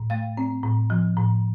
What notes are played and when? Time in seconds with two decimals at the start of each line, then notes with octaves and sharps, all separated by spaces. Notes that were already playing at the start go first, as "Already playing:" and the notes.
Already playing: A2
0.10 A3 F5
0.37 C4
0.63 A2
0.90 F3
1.17 A2